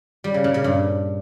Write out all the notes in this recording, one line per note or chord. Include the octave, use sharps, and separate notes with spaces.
G3
C#3
A#2
C#3
G2